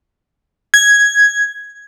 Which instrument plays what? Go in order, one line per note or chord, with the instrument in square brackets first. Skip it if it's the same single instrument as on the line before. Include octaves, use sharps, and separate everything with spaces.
[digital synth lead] G#6